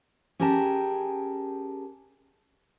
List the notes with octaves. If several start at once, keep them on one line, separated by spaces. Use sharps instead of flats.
C#4 G4 G#4 A#4 G5 A5